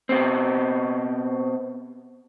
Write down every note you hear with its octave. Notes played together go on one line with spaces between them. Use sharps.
B2 C4